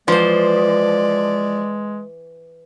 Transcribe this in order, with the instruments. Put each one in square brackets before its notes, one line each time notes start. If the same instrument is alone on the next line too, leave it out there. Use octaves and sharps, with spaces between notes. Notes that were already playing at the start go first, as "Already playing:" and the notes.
[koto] E3 C5 [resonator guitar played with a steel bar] F3 [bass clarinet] G#3 [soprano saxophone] D5